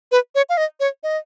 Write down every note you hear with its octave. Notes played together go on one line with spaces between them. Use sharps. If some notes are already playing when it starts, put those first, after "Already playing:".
B4
C#5
F5
D#5
C#5
D#5